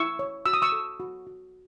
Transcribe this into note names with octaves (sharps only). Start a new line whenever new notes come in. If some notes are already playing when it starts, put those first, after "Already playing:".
Already playing: E4 C#6 E6
C#5
F#4 E6
D#6
C#6 E6
A4
F#4
F#4